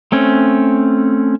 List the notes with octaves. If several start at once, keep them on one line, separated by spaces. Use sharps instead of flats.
A3 C4 C#4